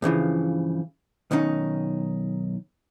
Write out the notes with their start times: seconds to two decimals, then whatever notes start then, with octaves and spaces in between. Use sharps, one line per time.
0.02 G2 C#3 E3 F3
1.31 B1 D#3 C#4 D#4